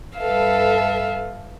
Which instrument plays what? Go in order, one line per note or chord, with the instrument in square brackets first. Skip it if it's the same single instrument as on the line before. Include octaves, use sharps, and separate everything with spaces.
[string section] G2 A4 B4 [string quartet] E5 F5